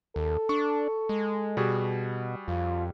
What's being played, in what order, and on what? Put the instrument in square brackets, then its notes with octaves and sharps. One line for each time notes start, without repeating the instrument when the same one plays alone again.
[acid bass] D#2 [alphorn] A4
[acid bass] D4 [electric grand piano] C#6
[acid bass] G#3
[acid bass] B2 [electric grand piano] G3 F#4 G#4
[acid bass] F2 [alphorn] F4